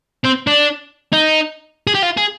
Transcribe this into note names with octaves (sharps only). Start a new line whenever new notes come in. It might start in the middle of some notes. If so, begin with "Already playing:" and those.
C4
D4
D#4
G#4
G4
F4
G#4